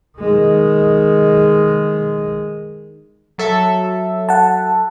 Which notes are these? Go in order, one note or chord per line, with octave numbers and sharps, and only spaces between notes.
D#3 G#3
F#3 A4 E5
F#5 A5